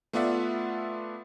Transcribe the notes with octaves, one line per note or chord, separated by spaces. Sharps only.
A3 B3 F4 D5 E5 F#5